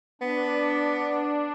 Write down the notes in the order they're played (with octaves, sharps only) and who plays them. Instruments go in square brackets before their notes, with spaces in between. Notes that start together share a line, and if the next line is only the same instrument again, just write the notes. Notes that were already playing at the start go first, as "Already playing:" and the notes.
[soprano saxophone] B3 [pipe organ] D4